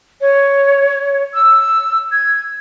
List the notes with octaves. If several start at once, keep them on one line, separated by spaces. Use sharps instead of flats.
C#5
E6
G#6